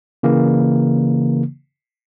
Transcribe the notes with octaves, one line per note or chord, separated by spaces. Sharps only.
C#3 E3 A#3